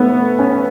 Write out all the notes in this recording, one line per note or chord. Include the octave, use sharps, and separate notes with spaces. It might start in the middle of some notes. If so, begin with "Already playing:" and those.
Already playing: A3 B3
C#4